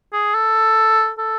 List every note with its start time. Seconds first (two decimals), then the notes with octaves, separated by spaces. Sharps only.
0.13 G#4
0.34 A4
1.19 A4